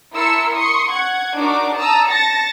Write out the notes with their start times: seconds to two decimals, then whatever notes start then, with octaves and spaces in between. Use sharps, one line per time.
0.12 E4 A#4 A5 C6 E6 C#7
0.54 C6 C#6 D#6 C#7
0.91 F#5 G#6
1.36 D4 D#4 F#4 A#4 D6
1.75 A5 A#5 D#6 E6
2.07 A5 A6 A#6 C#7